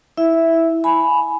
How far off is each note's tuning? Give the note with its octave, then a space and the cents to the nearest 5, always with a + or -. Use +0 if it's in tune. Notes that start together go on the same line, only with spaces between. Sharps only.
E4 -10 E5 +0
G#5 +15 B5 +0